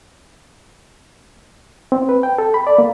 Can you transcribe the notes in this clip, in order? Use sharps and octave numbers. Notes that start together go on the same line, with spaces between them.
C4
B4
G5
A4
B5
D5
A#3